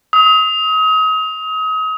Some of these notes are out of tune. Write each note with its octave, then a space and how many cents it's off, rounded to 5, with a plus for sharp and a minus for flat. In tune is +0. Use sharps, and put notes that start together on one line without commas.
D#6 +35